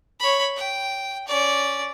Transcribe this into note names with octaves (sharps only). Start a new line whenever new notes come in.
C#5 B5
G5
C#4 D5